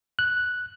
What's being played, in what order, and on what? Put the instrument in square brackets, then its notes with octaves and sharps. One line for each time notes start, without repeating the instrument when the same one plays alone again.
[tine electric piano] F#6